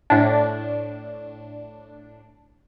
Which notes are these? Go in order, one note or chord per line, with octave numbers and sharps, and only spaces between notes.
A2 D4